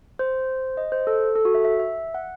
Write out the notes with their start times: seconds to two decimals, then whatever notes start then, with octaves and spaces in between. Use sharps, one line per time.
0.19 C5
0.77 D#5
0.92 C5
1.07 A4
1.36 A4
1.45 F#4
1.55 E5
1.65 E5
1.80 E5
2.14 F#5